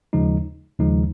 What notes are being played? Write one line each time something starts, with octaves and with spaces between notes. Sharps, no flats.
D#2 C#3 F3 G#3 D#4
D#2 C#3 F3 G#3 D#4